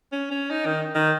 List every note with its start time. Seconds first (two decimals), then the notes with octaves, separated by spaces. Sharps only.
0.12 C#4
0.31 C#4
0.51 D#4
0.66 D#3
0.95 D#3